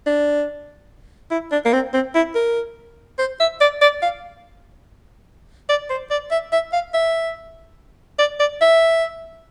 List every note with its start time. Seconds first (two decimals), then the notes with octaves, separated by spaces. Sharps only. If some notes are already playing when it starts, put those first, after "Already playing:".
0.06 D4
1.31 E4
1.52 D4
1.65 A#3
1.73 C4
1.94 C4
2.15 E4
2.35 A#4
3.19 C5
3.40 E5
3.61 D5
3.81 D5
4.02 F5
5.69 D5
5.90 C5
6.10 D5
6.31 E5
6.52 E5
6.73 F5
6.94 E5
8.19 D5
8.40 D5
8.61 E5